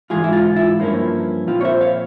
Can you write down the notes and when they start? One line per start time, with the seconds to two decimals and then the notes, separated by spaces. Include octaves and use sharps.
0.10 G#2 E3 G#3 F4 G#4
0.24 E4
0.33 F4
0.56 E4
0.79 G2 F3 A#3 C#4 E4
1.47 A#2 F3 C4 E4 F4
1.61 C#5
1.64 C5 E5
1.81 C#5 F5